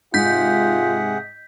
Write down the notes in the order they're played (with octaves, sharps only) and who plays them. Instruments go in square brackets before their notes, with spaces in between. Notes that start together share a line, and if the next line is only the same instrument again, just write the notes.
[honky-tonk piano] G#2 [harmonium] C3 G#4 F#5 [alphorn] F4 [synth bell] G6 B6